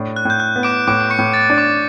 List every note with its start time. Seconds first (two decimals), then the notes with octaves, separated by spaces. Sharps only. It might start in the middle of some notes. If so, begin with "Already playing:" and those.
Already playing: A2 D4
0.16 F#6
0.25 A2 G6
0.40 F#6
0.56 B3
0.63 D6 D7
0.87 A2 D6 D7
1.10 C#6 C#7
1.19 A2
1.33 A6
1.50 D4
1.58 D6